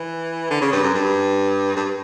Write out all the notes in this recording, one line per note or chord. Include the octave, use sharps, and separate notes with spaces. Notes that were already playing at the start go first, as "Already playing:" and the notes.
Already playing: E3
D3
C#3
G2
F#2
G2
G2